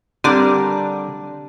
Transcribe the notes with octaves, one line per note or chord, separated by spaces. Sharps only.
D3 G3 C4 D4 G4 A#4 D5